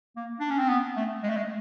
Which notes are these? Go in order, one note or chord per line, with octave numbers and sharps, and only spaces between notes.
A#3
D4
C#4
C4
B3
A3
G#3
A3
G#3